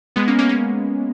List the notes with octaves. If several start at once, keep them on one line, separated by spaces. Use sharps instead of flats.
G#3 B3
A#3 C#4
A#3 C#4
A#3 C#4